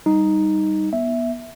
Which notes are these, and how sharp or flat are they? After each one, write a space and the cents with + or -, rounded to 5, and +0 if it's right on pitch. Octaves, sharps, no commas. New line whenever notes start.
G3 +0 D#4 +0
B3 -30 E5 +0